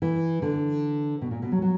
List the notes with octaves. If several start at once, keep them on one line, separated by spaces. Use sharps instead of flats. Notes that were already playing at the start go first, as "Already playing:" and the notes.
E3
D3
B2
A#2
B2
F#3
F#3